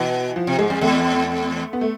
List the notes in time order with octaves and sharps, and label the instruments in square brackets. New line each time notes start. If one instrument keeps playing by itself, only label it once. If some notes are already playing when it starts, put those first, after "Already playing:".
Already playing: [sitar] B2 [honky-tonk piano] E3
[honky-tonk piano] F3
[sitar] C3
[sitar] G#2 [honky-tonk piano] G#3
[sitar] F2
[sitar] E2 [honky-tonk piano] A3
[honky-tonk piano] B3
A3